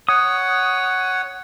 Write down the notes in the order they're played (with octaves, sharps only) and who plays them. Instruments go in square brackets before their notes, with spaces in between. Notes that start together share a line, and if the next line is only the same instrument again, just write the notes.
[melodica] C#5 F#5 [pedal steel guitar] D#6